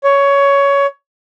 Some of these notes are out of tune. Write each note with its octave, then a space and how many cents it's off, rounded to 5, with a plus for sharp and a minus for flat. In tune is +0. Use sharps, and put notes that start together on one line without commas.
C#5 +15